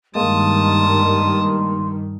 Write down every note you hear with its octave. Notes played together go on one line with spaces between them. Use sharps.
G2 D#3 G#3 A#3 A5 C6 D#6